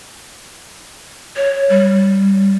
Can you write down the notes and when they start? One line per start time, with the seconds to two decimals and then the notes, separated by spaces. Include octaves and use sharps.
1.36 C#5
1.70 G3